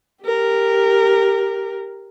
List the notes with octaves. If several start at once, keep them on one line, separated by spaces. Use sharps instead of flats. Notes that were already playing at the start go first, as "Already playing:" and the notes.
G4 A#4